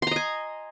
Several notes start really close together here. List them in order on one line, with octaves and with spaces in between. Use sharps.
C6 A#5 D#5 G#5